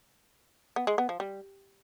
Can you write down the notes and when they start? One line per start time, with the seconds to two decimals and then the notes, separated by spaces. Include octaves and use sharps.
0.76 B3
0.87 G#3
0.98 B3
1.09 F3
1.20 G3